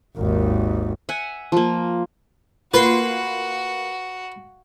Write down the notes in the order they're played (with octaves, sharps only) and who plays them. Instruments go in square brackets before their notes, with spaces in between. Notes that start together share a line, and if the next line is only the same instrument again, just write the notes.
[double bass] G#1 D#2
[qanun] E5 F#5 G#5
F3 A#3
[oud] A#3 [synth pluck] F4 C6 C7 [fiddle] F#4 [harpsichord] B4